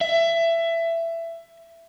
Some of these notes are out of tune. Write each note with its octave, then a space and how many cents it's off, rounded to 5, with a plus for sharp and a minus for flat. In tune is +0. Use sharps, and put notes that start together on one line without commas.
E5 +20